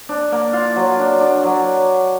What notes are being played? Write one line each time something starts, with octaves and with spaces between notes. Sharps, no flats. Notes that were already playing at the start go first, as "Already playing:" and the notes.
D4
A#3
F4
F#3
D4
D4
F#3